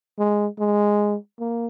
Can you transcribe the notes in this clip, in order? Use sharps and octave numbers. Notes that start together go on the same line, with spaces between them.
G#3
G#3
A#3